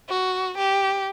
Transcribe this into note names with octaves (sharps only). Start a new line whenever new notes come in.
F#4
G4